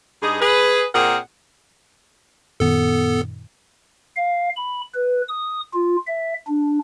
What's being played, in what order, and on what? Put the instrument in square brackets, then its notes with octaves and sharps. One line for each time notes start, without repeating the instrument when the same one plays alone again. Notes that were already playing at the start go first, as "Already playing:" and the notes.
[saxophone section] G2 D#4 G#4
G#4 B4
A#2 C4 G#4 A#4 F#5
[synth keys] F#2 A#2 D#3 [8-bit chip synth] B3 A4
[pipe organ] F5
B5
B4
D#6
F4
E5
D4